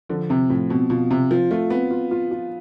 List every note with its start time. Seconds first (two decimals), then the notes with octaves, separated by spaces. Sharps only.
0.09 D3 F3
0.29 C3 C4
0.50 A2 F3
0.70 B2 C4
0.90 B2 F4
1.11 C3 C4
1.31 F3 F4
1.51 A3 F4
1.70 B3 C4
1.91 F4
2.11 F4
2.31 F4